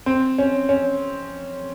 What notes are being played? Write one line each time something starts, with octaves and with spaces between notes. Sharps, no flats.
C4
C#4
C#4